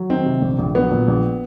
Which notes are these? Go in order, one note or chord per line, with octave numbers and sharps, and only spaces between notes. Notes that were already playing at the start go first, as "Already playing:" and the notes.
Already playing: F#3
D#3 C4
C3
A#1
A#1
F#3 B3
A#2
A#1